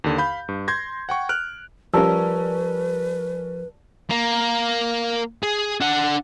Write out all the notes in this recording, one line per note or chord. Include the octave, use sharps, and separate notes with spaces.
D#2 D3
F5 B5 G6
G2
C6 G6 G#6 A#6
F#5 G5 C#6
F6 F#6 D7
F3 G3 C#4 A#4 B4 D5 A5 E6
A#3
G#4
D4 F#5